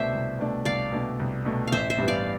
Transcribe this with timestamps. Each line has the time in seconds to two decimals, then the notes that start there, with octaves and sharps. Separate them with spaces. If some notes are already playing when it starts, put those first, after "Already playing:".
Already playing: C2 B2 A3 D4 C5 D5 E5
0.13 C2
0.39 B2 A3 D4
0.65 C2 D5 F5
0.92 B2 A3 D4
1.20 C2
1.45 B2 A3 D4
1.67 A1 C5 E5 F5
1.90 C5 E5
1.98 G2 E3 G3 B3
2.08 D5 F5